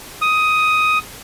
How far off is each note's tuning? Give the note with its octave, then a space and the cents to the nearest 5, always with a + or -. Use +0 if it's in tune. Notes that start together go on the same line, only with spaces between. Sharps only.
D#6 +10